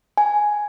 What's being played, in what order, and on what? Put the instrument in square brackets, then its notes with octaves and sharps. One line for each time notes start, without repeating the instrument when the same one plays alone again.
[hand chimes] G#5